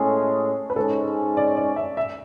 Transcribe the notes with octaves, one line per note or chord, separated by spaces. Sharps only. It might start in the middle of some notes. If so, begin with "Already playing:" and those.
Already playing: A2 G#3 C#4 G#4 A4
B4
G#2 G#3 C#4 A4
D5
D5
E5
E5